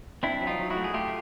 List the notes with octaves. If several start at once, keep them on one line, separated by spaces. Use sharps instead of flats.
C4 D4 E4
F#3
D#4 F4
F#3
E4 F#4
A3
G#4
A3 F4 G4